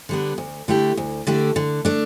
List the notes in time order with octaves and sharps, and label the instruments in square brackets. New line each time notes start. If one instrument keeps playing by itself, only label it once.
[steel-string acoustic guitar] D3 G3 B3
D2
D3 A3 E4 G4
D2
D3 A3 E4 G4
D3
A3 D4